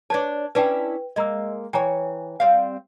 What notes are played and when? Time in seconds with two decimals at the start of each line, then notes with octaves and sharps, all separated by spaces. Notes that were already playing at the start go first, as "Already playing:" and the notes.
0.10 D4 B4 C#5 A5 G#6
0.55 C#4 D4 E4 B4 G5
1.16 G#3 A#3 D#5 A#5 E6
1.73 E3 C#5 G5 G#5 A#5
2.40 G3 C4 F5